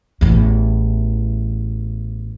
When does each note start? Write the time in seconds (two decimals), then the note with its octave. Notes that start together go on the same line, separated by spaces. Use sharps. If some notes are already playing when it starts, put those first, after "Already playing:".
0.21 A1 E2